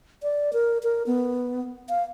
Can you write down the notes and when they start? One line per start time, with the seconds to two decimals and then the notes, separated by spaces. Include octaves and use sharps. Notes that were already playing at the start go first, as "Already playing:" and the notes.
0.23 D5
0.53 A#4
0.83 A#4
1.07 B3
1.89 F5